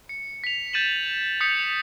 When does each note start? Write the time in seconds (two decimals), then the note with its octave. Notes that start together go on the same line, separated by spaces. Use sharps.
0.09 C#7
0.44 B6 F7
0.73 G6 A6 D#7 E7 F#7
1.41 D#6 G6 B6 C#7